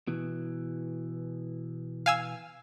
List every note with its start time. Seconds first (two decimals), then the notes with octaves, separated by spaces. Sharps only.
0.07 B2 E3
2.06 F5 G#5 E6